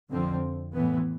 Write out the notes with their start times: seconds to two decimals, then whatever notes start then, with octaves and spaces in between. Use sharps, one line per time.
0.11 F2 D3 F3 C4
0.73 A2 E3 B3